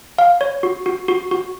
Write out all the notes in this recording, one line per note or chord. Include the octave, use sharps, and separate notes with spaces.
F5
C#5
F#4
F#4
F#4
F#4